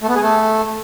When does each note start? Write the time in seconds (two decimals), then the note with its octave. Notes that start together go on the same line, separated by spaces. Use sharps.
0.02 A3
0.09 B3
0.15 G#4
0.22 A3